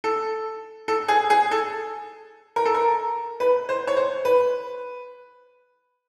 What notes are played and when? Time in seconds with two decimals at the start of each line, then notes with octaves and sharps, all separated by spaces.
0.04 A4
0.88 A4
1.08 G#4
1.30 G#4
1.51 A4
2.56 A#4
2.65 A4
2.74 A#4
3.40 B4
3.69 C5
3.87 C#5
3.97 C5
4.25 B4